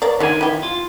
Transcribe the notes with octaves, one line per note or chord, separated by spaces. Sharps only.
A#4 C#5 D5
D3 D#3 A#3 G#5
E4 G4
F4